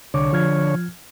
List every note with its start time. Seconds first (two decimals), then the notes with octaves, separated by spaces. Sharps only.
0.14 C2 D3 C#5 D6
0.33 F3 F6 G#6